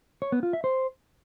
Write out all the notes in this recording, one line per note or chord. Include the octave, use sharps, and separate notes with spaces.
C#5
B3
F4
E5
C5